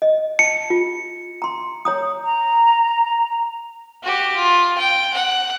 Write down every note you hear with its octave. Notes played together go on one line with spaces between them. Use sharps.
D#5
A5 C#7
F4
A#5 C6
C#5 A#5 D#6
A#5
F#4 G4
F4
G5
F#5